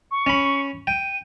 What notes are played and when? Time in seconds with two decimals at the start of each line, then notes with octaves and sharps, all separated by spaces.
0.11 C#6
0.26 C#4 B5
0.87 G5 D#7